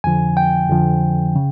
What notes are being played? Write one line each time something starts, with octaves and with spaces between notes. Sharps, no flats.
F2 D3 F3 G#5
G5
F2 D3 F3
C#3